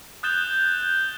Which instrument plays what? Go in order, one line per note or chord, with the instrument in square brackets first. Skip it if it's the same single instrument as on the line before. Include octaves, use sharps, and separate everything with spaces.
[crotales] D#6 F#6 G6 A6 E7 G7